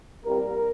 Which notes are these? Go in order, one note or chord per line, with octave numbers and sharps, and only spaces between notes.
C2 A#2 G3 C4 A#4